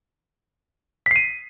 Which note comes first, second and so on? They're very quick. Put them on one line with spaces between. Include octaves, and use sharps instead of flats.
B6 C7 D#7